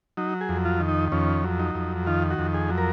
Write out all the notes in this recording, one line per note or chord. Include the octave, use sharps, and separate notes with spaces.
F#3 D#4
G#4
F2
F4
D#3
D#4
F2 C#4
F#3
D#4
F2
D#3 F4
F#4
F2
G#4
F#3
A#4